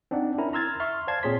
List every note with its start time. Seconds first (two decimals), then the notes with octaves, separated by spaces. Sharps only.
0.11 C4 D4 D#4 D5 F#5
0.38 C#4 E4 A#4 A#5
0.53 A#5 C6 E6 F6 G#6 A6
0.80 E5 C6 C#6 F6
1.07 C5 D5 F5 A5 G#6 C7
1.23 A#2 C4 G#4 C#5 C6 B6